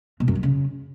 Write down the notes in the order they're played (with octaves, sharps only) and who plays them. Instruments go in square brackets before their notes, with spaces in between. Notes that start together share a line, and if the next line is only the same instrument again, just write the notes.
[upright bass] B2
F#2
F#3
C#3